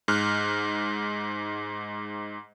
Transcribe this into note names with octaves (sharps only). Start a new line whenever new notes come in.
G#2 F6 F#6